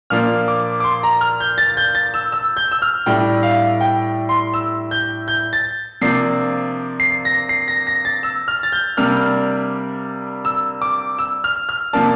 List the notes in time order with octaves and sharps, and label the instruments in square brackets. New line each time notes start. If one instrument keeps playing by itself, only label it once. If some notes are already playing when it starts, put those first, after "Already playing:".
[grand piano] A#2 F3 A#3 D4 F6
D6
D6
C6
A#5
F6
G6
A6
G6
A6
E6
E6
G6
E6
F6
A2 G3 D4 G5
F5
G5
C6
E6
G6
G6
A6
C3 F3 A#3 D4 C7
C7
A#6
C7
A#6
A#6
A6
E6
F6
A6
G6
C3 G3 A#3 D4 F6
E6
D6
E6
F6
F6
C3 F3 A#3 D4 A5